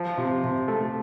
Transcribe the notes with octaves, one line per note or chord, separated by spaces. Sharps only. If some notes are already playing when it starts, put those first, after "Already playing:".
Already playing: F3
C3
C3
A3